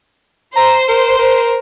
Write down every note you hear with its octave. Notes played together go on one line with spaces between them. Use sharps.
C5 A#5
A#4
A#4